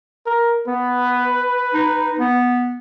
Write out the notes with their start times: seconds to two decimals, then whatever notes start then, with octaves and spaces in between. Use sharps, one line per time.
0.26 A#4
0.67 B3 B4
1.74 D#4
2.19 B3